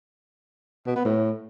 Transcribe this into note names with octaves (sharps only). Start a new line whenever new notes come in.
B2
B3
A2